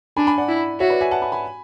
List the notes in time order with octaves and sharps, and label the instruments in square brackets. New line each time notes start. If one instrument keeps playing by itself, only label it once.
[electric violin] D4 [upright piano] G#5 B5
[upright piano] G#5 B5
D5 F#5
[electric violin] E4
[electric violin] F#4 [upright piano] C#5 E5
[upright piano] B4 D5
E5 G#5
F#5 A5
G#5 B5
G#5 B5